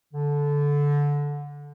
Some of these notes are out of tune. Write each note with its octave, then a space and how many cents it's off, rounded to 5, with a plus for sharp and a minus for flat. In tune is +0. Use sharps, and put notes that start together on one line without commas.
D3 -15